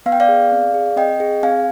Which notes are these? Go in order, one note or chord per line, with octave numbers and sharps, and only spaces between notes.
B3 F5
G5
D5 F5
G#4
C4
G#4
C4 D#5 G5
G#4
C4 F5 G#5